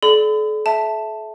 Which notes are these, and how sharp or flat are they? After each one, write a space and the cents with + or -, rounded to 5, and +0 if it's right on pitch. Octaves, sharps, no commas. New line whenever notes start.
A4 -45 D5 +0 B5 +40
E5 -5 A5 +0